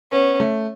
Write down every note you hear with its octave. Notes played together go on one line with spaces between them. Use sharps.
B3 C#4
A3